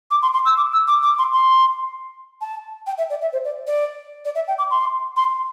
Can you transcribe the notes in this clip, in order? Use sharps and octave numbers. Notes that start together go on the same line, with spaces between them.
D6
C6
C6
E6
D6
E6
D6
D6
C6
C6
A5
G5
E5
D5
E5
C5
D5
D5
D5
E5
G5
D6
C6
C6